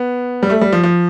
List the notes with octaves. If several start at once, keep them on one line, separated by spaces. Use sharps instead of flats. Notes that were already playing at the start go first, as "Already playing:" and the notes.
Already playing: B3
G3
A3
G3
F3
F3